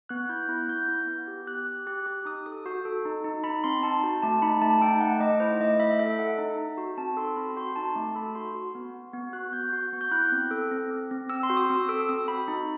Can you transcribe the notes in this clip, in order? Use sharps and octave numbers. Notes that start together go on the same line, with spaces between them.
B3 F#6
E4 G6
E4 F#6
B3 G6
E4
B3
G4
G4 F#6
G4
G4 F#6
G4
D#4 D#6
A4 D#6
F#4
A4
D#4
D#4
D#4 B5
C4 C6
D#4 A5
F#4
A3 A5
D#4 B5
A3 A5
D#4 G5
A3 F#5
A3 D#5
E4 C5
A3 D#5
E4 E5
A4 E5
A4 F#5
D#4
D#4
F#4
C4 A5
A4 C6
C4 B5
F#4 C6
D#4 A5
A3
A4 B5
F#4 C6
F#4
B3
B3
B3
F#4 F#6
B3 G6
F#4
B3
G6
E4 F#6
C4
A4
C4
C4
C4
C4 E6
C6
F#4
D#6
C4 E6
A4 E6
C4 D#6
F#4 B5
D#4